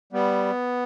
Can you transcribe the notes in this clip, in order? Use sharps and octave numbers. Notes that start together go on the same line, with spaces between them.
G3 B3